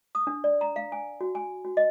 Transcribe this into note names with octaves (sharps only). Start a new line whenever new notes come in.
D#6
D4
D5
A#5
F5
G#5
F#4
G#5
F#4
D#5